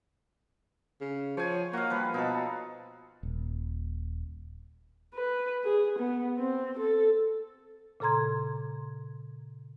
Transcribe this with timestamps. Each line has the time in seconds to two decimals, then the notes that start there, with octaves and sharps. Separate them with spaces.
1.01 C#3
1.37 F3 C#5 G#5
1.73 A#3 F#4 F5
1.90 F3 G3 B4
2.14 B2 D#4 A4
3.23 D#1
5.15 B4
5.64 G#4
5.99 B3
6.38 C4
6.79 A4
8.00 A#2 C#3 A4 A#5 C6 G#6